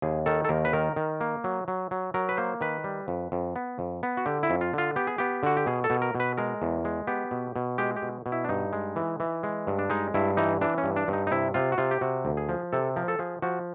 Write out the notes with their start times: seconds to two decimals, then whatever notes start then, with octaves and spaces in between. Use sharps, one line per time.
0.02 D#2 G#4
0.26 D#3 A4
0.45 A4
0.49 D#2 A#4
0.65 B4
0.73 D#3 A#4
0.96 D#3
1.21 A#3
1.44 F#3
1.68 F#3
1.91 F#3
2.14 F#3 A#4
2.29 B4
2.37 A#3 C5
2.61 D#3 B4
2.84 G3
3.08 F2
3.32 F2
3.56 B3
3.79 F2
4.03 B3
4.17 F#4
4.26 D3 G4
4.43 E4
4.50 F2
4.61 F4
4.73 D3 F4
4.96 B3 G4
5.07 G#4
5.18 B3 G4
5.43 D3 F#4
5.57 G4
5.66 B2 G#4
5.84 A4
5.90 B2
6.02 A#4
6.15 B2
6.20 B4
6.37 G#3 A#4
6.62 E2
6.85 G#3
7.07 B3 G4
7.31 B2
7.56 B2
7.78 G#3 G4
7.96 G4
8.02 B2
8.26 B2
8.32 E4
8.44 D4
8.49 G2 D#4
8.73 G#3
8.96 E3
9.20 E3
9.43 G#3
9.67 G2
9.79 D4
9.90 G#3 D#4
10.14 G2 E4
10.37 E3 D#4
10.61 E3 D4
10.78 C#4
10.84 G2
10.96 D4
11.08 G2
11.13 D#4
11.27 D#4
11.31 C3 E4
11.54 C3 F4
11.72 F#4
11.78 C3 F4
11.91 G4
12.01 C3 F#4
12.25 D2
12.37 G#4
12.49 F3
12.72 C3 A4
12.96 F3 A#4
13.08 A4
13.19 F3 G#4
13.42 F3 F#4